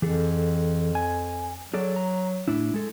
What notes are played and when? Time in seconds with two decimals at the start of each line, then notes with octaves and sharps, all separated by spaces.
0.02 F2 E3 G#4 A4
0.95 G#5
1.74 F#3 G#4 A4 D5
1.96 A#5
2.48 A2 D4 E4
2.74 G#3 A4